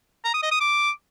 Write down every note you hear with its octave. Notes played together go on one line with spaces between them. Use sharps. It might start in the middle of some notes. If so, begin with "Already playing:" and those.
A#5
D#6
D#5
D#6
D6